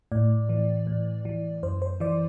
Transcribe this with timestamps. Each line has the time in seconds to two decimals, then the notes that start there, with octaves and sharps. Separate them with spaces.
0.12 A2 D5
0.49 E3
0.87 A2
1.25 E3
1.63 F#2 C5
1.82 C5
2.00 E3 D5